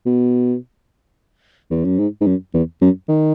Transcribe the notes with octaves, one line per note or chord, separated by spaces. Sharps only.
B2
E2
F#2
G#2
G#2
F#2
E2
F#2
D#3